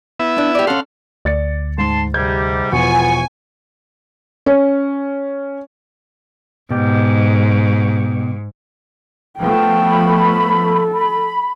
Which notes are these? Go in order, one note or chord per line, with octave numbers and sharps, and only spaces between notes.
B3 E4 E5
D4
G4 D5
C#4 A4 F5 F#5 C6
D2 D5 A6 C#7
G#2 A5 C6
G#2 C3 G3 G6 G#6
E1 F3 B3 F4 G#5 C#6
C#4
G#2 B2 G4
F3 A3 B3 G5
B5
A4
B5